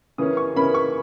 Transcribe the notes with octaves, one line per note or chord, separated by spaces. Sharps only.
C#3 E3 A#3 C#4 D#6
C#6
C#3 E3 A#3 C#4 B5
C#6